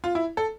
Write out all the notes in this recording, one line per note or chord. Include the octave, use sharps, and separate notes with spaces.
F4
E4
A4